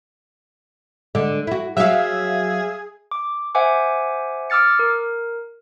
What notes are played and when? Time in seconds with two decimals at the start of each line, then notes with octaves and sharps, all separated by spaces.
1.15 D3 G#3
1.47 E4 F#4
1.77 F#3 F#4 G#4 E5 F5
3.11 D6
3.55 C5 E5 F#5 G#5 D6
4.50 D6 E6 F6 A6 C#7
4.79 A#4